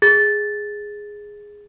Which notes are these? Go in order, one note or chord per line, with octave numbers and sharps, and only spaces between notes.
G#4 A6